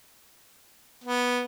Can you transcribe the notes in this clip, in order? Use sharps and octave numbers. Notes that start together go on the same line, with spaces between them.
B3